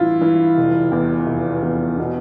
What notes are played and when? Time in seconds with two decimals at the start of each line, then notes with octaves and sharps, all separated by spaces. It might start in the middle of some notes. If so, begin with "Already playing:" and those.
Already playing: A1 G2 E3 E4 F4
0.21 E3
0.57 F1
0.92 E2
1.27 F1
1.62 E2
1.98 B2